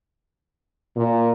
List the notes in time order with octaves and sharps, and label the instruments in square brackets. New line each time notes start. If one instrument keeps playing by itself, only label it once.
[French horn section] A#2